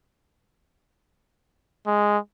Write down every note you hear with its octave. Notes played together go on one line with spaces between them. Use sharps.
G#3